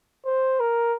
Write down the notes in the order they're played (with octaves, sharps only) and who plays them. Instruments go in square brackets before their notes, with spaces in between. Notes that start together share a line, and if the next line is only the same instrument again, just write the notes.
[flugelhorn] C5
A#4